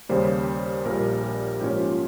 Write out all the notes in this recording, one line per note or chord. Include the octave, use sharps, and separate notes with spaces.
D#2 C#3 G3 A#3 C5
A#1 A#2 G3 A#4
G4
G#2 F3 A#3 C#4 G4
F4